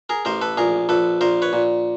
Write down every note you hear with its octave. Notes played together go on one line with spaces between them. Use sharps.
G#4 A#4
A1 A#4 C5
A4 B4
A#1 G#4 A#4
A#1 A4 B4
A#1 A#4 C5
B4 C#5
A#2